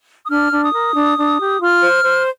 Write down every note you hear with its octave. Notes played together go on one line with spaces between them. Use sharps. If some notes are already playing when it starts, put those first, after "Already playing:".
D#6
D4 F6
D4
D#6
A#4
D4
D4
G4
F4 F6
C5
C5